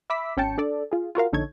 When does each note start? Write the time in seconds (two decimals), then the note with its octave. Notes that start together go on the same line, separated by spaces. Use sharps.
0.10 E5 B5 D6 E6 B6
0.37 G#1 C#4 G5 A5 C#7
0.58 D4 A4 D5
0.91 F4 G#4
1.15 F4 F#4 A#4 F5
1.32 A#1 D3 D#4 A4 C#5 G#6